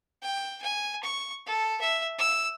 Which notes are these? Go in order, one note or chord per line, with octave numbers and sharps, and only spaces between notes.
G5
G#5
C#6
A4
E5
E6